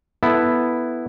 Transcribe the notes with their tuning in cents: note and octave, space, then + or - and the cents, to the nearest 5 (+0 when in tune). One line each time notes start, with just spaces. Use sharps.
B3 +0 E4 +0 A4 +0